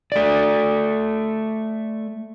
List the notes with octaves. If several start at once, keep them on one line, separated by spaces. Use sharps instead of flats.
A3 D5